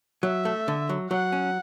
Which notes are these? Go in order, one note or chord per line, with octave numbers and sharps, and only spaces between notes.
F#3 E5
A3
D3
F#3
F#3 F#5
C#4